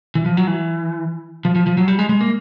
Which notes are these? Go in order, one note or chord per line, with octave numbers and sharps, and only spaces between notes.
E3
F3
F#3
E3
F3
F3
F3
F#3
G3
G#3
G#3
A#3